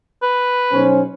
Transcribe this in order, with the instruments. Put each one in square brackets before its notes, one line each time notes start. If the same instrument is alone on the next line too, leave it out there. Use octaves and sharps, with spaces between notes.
[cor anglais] B4
[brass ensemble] B1 C#4 C5